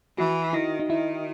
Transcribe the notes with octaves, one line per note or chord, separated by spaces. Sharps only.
E3 F#4
D#3 E4
D#4
D#3 E4